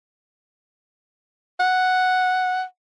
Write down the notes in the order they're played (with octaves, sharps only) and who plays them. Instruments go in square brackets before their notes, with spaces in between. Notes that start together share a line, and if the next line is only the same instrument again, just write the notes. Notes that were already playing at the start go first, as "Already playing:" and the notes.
[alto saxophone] F#5